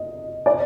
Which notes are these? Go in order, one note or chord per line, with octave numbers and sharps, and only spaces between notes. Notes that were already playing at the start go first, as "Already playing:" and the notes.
Already playing: D#5
D5